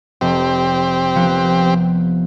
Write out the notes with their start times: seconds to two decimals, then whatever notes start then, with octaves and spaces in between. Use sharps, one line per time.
0.21 F1 C4 G4
1.15 F3 A#3 B3